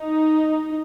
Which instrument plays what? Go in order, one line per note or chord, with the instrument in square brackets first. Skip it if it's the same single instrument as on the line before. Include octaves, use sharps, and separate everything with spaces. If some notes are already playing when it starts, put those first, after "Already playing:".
Already playing: [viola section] D#4